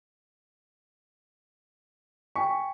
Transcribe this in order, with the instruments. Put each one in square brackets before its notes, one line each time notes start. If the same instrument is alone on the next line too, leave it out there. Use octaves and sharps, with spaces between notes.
[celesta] G5 G#5 B6 [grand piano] C#6